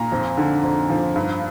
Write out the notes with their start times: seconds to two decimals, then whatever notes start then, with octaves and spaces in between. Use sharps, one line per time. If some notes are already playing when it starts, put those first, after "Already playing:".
Already playing: A#2 A#5
0.12 F2
0.38 D3
0.64 F2
0.90 F3
1.16 G2